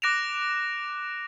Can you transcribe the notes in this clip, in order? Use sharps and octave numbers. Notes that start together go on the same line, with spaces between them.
D6 F#6 A#6 D7 E7 F7